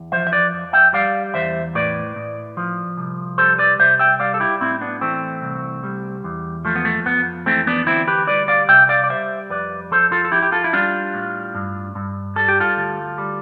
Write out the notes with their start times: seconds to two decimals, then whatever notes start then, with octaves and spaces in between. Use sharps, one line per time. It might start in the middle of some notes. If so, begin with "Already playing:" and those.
Already playing: E2
0.12 F3 C5 E5
0.27 E5
0.33 B4 D5
0.53 F2
0.73 E5 G5
0.93 G3 D5 F5
1.34 E2 C5 E5
1.75 A2 B4 D5
2.16 A2
2.57 F3
2.97 C2
3.38 G3 A4 C5
3.59 B4 D5
3.79 C2 C5 E5
3.99 E5 G5
4.20 G3 D5 F5
4.34 A4
4.40 E4 G4
4.60 A2 C4 E4
4.81 B3 D4
5.01 E3 A3 C4
5.42 C2
5.84 G3
6.24 E2
6.65 F3 A3
6.75 B3
6.85 A3
7.06 F2 B3
7.46 E3 A3 C4
7.67 B3 D4
7.87 D2 C4 E4
8.07 G4 B4
8.27 G3 B4 D5
8.48 D5 F5
8.68 C2 E5 G5
8.89 D5 F5
9.04 D5
9.10 G3 C5 E5
9.50 F2 B4 D5
9.91 F3 A4 C5
10.12 F4 A4
10.25 A4
10.32 F2 E4 G4
10.42 G4
10.52 F4 A4
10.64 E4
10.73 G3 D4 F4
11.14 A2
11.55 G2
11.95 G2
12.36 G3 A4
12.48 G4
12.60 F4 A4
12.77 D2
13.18 G3